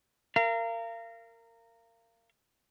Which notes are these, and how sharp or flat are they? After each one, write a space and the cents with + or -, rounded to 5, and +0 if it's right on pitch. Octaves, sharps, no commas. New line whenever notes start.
A#4 -20 F5 -30